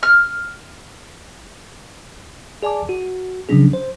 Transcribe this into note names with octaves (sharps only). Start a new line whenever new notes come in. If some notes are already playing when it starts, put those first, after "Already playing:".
F6
G#4 D5 G#5 A5 D6
F#4
C#3 F3 F#3 C#4 D4 G#4
C5